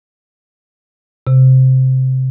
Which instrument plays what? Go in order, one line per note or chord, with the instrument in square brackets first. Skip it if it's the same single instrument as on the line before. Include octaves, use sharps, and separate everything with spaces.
[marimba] C3